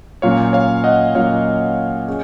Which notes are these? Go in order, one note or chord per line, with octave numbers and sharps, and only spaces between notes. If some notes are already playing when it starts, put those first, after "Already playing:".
A#2 F#3 C#4 C#5 F5
C#5 F5
D#5 F#5
A#2 F#3 C#4 C#5 F5
C#4 G#4